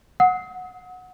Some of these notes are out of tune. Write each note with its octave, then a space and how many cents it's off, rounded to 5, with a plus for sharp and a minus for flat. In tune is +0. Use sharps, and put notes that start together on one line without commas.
F#5 -15 D#6 +40